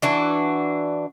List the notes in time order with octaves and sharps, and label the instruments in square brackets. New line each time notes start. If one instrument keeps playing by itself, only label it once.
[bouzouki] E3 D4 F#4